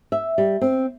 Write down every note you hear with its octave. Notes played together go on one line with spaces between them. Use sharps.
E5
G3
C4